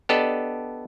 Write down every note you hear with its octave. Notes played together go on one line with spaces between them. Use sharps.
B3 D4 G4 A4 D5 D#5